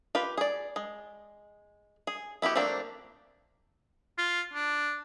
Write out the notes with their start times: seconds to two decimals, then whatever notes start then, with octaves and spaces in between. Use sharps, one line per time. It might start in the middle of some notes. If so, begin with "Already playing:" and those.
0.15 F4 G4 B4
0.37 G#4 D5
0.76 G#3
2.07 G#4
2.42 B3 E4 F#4 G4
2.56 F3 A3 A#3 C4 D4
4.18 F4
4.54 D4